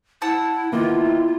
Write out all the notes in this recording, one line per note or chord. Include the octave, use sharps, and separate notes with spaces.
E4 F#5 A5 E6
D#3 A#3 B3 E4 F4